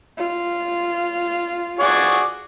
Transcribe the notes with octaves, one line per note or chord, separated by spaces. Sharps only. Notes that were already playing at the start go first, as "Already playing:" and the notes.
F4
F#4 G#4 D5